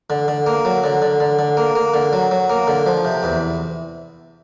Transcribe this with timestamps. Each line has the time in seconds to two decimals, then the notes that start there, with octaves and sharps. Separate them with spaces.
0.10 D3
0.28 D3
0.46 A#3
0.65 F#3
0.84 D3
1.02 D3
1.20 D3
1.39 D3
1.57 A#3
1.75 A#3
1.94 D3
2.13 F#3
2.31 F#3
2.50 A#3
2.67 D3
2.86 F3
3.05 C3
3.23 E2